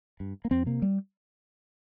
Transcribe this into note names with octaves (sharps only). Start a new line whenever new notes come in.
G2
A#3
F2 C4
C3 A#3
G3